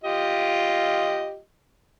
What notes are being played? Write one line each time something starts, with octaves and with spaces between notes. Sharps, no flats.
F4 G4 D#5